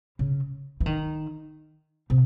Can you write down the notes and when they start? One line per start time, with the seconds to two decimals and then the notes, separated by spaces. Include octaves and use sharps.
0.19 C#3
0.80 E3
0.86 D#3
2.10 C3